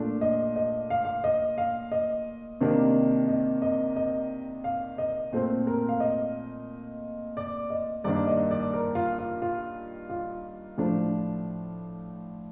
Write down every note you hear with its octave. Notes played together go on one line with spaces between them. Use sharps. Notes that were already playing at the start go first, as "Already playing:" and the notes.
Already playing: A#2 A3 D4
D#5
D#5
F5
F5
D#5
F5
D#5
C3 D#3 A#3 D4
D#5
D#5
D#5
F5
D#5
A#2 A3 C4 C5
A#4
F5
D#5
D5
D#5
G2 D#3 A#3 D4 D5
D#5
D5
A#4
F4
F4
F4
F4
A2 F3 A3 D4